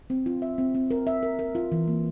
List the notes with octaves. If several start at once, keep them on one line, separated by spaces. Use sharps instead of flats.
C4
F4
E5
C4
C4
A#4
E5
A#4
A#4
F4
E3
A#3